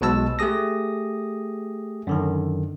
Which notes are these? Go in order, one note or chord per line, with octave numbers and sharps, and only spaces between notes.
B1 B2 G#3 A5 E6
A3 G4 G#4 D#6 A#6
F#2 D3 D#3